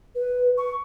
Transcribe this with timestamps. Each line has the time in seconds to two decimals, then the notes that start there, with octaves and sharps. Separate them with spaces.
0.15 B4
0.58 C#6